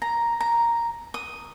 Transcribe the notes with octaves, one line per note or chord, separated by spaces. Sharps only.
A#5
A#5
D#6